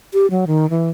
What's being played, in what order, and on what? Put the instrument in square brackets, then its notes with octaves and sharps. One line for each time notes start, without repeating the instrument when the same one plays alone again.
[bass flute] G4
F#3
D#3
E3